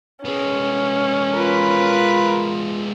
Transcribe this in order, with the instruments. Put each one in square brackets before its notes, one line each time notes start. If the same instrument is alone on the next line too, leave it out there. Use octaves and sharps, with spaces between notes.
[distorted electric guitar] G#3 B3 [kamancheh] C#4
[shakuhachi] F4 [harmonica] A#4 B4 B5